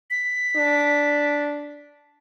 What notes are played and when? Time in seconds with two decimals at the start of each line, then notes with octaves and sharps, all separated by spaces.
0.10 B6
0.56 D4